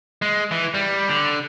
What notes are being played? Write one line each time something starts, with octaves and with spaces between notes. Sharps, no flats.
G#3
E3
G3
D3